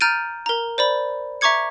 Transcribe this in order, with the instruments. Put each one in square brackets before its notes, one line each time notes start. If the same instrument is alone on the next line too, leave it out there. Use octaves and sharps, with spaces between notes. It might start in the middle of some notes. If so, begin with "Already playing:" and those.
[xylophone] A#5 F6 G6 A6 D7 D#7
A#4 A#5
C5 D5 B5
E5 A#5 C#6 D6 G#6 C#7